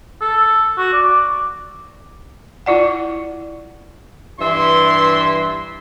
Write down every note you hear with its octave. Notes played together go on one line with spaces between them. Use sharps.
A4
F#4
D5
E4 F4 D5 F#5
G2 E3 E5 C6